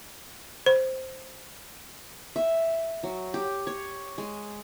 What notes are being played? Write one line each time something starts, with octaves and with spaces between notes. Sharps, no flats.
C5
E5
F#3
G4
C#5
G#3